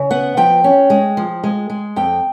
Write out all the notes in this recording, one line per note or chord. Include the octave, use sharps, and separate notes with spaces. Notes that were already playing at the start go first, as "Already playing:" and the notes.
Already playing: C#3
B3 F#5
F3 G5
C#4
G#3
F3
G#3
G#3
F2 G5